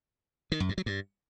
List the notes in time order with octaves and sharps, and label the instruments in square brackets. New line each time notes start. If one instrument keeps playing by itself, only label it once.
[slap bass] D#3
F#2
G2
F#3
G2